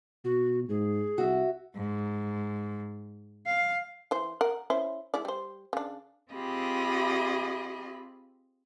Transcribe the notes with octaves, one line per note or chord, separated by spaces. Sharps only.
B2 F#4
G#2 G#4
C2 F#4 E5
G#2
F5
E3 C5
A#4 F#5
C#4 E4 C5
G#3 E4 D5
G3 C5
C#3 D4
C4 F4 G4 G#4 D#5 B5